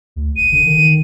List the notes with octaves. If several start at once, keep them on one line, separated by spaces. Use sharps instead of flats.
D2
D#1 D#7
D3
D#3